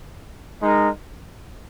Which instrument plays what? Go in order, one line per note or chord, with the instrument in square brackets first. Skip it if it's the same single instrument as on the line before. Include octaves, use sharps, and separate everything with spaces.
[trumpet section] G#3 D#4 A#4